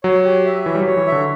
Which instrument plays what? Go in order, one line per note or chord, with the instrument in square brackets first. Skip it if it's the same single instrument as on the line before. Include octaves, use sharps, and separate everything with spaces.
[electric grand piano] F#3 [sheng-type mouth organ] C#5
[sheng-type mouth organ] G4
E5
[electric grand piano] E3 [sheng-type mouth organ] C#5
[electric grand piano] G3
[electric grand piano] F#3 [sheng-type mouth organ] C#5
[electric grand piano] E3
[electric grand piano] D3 [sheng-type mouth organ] E5